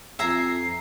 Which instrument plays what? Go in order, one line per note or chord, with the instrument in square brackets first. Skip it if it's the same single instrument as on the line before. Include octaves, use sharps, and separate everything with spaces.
[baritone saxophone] F2 [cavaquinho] E5 G#5 A#5 [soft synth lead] C7